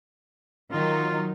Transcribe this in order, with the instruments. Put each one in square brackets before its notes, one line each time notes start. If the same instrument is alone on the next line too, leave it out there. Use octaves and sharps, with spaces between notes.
[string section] D#3 F#3 D#4 [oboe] F4